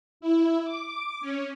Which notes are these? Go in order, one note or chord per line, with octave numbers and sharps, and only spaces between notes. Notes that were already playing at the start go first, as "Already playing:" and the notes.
E4
D6
C#4